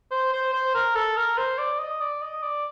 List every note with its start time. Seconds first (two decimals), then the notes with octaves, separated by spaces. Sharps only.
0.11 C5
0.33 C5
0.53 C5
0.75 A#4
0.95 A4
1.17 A#4
1.38 C5
1.58 D5
1.79 D#5
2.01 D5
2.22 D#5
2.43 D5